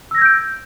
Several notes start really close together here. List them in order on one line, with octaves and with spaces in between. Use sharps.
E6 A#6 G#6 G6 D7